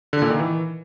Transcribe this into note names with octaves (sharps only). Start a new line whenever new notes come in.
D3
A#2
D#3
E3